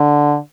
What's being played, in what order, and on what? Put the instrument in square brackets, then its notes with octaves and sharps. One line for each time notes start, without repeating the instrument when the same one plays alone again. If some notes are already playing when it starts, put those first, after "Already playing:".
Already playing: [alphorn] D3